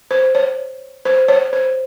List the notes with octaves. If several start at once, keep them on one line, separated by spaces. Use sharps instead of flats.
C5
C#5
C5
C#5
C5